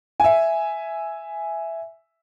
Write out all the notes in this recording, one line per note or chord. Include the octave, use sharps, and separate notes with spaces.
E5 G#5